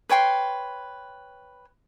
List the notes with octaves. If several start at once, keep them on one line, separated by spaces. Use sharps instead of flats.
B4 C#5 G5 C6